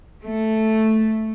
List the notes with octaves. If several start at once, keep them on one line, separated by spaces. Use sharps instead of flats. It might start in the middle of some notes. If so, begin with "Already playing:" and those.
A3